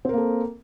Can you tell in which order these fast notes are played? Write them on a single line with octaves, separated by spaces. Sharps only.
C4 A#4 A#3 A4